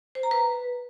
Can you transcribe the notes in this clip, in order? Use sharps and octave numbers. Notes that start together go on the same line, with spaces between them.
C5
A#5
B4